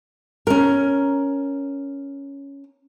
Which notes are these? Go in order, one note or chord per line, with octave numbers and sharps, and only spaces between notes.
C#4 A#4